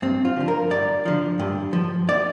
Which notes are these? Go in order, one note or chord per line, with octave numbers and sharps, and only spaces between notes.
G2 C4
F4
D3 F3
A#4
G2 D5
D3 F3
G2
F3
D5